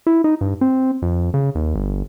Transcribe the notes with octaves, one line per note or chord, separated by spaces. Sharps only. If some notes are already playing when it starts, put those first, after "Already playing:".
E4
D#4
G2
C4
F2
C#3
D#2
G1